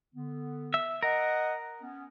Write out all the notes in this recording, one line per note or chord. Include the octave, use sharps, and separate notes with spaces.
D3 B3
E5
A#4 D#5 F#5
B3 C#4